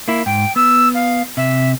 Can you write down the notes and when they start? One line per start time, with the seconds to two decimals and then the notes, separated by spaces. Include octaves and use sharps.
0.08 A#3 E4
0.26 G#2 G5
0.56 B3 E6
0.94 F5
1.37 C3 E5